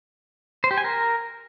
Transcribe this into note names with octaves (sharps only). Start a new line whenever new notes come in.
C5
G4
G#5
A#4